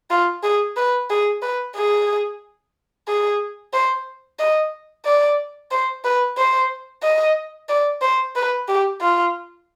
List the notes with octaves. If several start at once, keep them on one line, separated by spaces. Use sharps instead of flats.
F4
G#4
B4
G#4
B4
G#4
G#4
C5
D#5
D5
C5
B4
C5
D#5
D5
C5
B4
G4
F4